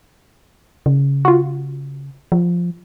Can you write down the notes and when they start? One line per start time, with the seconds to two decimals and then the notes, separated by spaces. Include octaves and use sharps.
0.86 C#3
1.25 F4 F#4
2.32 F3